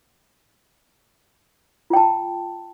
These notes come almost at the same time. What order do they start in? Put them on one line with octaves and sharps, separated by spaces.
F4 G5 A5